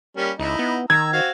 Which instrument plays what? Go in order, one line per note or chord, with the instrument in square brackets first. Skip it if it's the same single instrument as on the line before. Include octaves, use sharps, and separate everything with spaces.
[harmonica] G3 A#3 C#4
[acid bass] C#2 [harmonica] D#4 E4
[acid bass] B3
[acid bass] D#3 [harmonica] A#5 E6 [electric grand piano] G#6
[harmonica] C4 F#4 F5